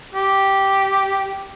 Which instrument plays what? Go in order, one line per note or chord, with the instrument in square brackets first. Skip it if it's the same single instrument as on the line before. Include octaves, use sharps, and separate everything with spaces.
[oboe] G4